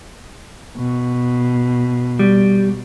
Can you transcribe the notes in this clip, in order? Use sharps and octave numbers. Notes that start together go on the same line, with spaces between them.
B2
G3